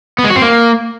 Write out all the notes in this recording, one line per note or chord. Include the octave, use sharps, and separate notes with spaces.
B3
G#3
F#4
C4
A#3